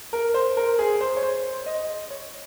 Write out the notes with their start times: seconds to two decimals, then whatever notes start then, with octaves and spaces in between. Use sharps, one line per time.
0.13 A#4
0.34 C5
0.57 A#4
0.79 G#4
1.01 C5
1.16 C#5
1.23 C5
1.66 D#5
2.10 C#5